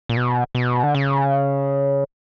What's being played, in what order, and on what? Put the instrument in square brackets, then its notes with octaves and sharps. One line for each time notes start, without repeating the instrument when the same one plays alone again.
[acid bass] A#2
B2
B2
D3
C#3